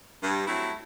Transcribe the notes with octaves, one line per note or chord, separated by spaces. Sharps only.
G2
F#3 A3 C4 E4